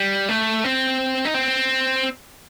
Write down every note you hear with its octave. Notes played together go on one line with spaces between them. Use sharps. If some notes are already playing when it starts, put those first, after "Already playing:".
Already playing: G3
A3
C4
D#4
C4